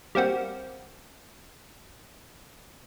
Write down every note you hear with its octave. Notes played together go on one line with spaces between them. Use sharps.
G3 A#3 C4 F#4